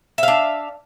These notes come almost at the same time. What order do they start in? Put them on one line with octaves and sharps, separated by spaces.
E5 F5 D4